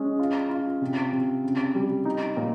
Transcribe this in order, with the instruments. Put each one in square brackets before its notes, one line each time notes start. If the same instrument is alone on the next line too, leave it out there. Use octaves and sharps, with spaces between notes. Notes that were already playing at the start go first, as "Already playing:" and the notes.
Already playing: [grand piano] G#3 C#4
F4
F4
C3
C3
C#3
G3
D#4
A#2